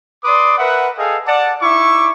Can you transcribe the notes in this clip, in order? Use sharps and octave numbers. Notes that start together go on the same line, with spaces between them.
B4 D5 C6 D6 D#6
A#4 B4 E5 F#5
G#4 A4 D#5 F5 G5 G#5
D5 F#5 A5
D#4 E4 E5 C#6 D6